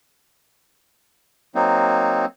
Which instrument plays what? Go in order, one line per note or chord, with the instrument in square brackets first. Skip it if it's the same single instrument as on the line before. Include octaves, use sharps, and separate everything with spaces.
[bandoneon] F#3 A#3 C4 D#4